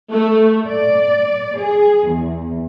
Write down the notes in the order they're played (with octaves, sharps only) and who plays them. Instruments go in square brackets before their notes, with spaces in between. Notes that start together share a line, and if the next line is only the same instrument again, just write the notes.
[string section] A3
D5
G#4
E2